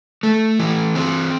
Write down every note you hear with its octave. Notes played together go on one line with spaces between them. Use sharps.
A3
E3
C4